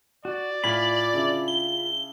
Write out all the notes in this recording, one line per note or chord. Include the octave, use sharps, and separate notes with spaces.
F#4 D5
A2 F4 G#5 B5 F#7
C#3 D4 E4
G7